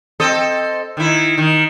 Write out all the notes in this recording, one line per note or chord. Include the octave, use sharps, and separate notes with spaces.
C4 A4 D#5
D#3 E4
D#3